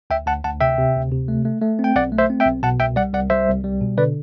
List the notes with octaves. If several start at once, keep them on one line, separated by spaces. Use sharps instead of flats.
D2 E5 G5
D2 F#5 A5
D2 F#5 A5
C3 E5 G5
C3
D2
C3
A3
A3
A3
C4
G5
B1 D5 F#5
A3
C5 E5
C4
E5 G5
B1
B2 F#5 A5
C2 E5 G5
G3 D5 F#5
C2 D5 F#5
G3 C5 E5
C2
G3
B2
D3 B4 D5